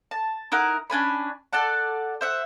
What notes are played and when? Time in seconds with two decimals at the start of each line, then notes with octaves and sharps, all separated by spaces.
0.11 A5
0.52 D#4 E4 A#4 F#5
0.90 C#4 D4 G#5 B5
1.53 A4 D5 F#5 A5
2.21 C5 E5 F#5